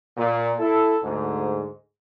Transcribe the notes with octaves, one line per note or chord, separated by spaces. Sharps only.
A#2
E4 A4
D2 G#2